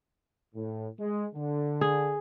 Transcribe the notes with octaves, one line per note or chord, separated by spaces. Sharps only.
A2
G#3
D3
G#4